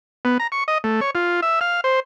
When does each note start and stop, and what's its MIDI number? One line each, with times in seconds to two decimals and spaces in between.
0.25 0.38 59
0.40 0.47 82
0.52 0.64 85
0.68 0.78 75
0.84 1.00 57
1.01 1.11 73
1.15 1.41 65
1.42 1.59 76
1.61 1.81 77
1.84 2.00 72